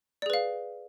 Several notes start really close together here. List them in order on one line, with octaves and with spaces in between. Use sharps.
D5 G#4 B4 F5